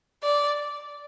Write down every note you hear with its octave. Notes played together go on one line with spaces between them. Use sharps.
D5